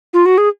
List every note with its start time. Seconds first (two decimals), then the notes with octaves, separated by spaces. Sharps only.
0.13 F4
0.26 F#4
0.38 G#4